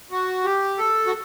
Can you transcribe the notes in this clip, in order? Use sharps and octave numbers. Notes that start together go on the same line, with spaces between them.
F#4
G4
A4
F#4